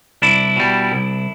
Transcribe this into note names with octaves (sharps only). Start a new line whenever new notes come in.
C2 D4 E4
B2 G3
C2